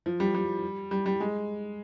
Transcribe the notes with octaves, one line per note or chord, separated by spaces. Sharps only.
F3
G3
G3
G3
G3
G#3